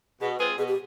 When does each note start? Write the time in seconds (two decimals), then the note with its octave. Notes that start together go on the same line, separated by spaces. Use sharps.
0.21 B2 G#4
0.39 G#3 C4 F4 G#4 B4
0.57 B2 G#4
0.68 G4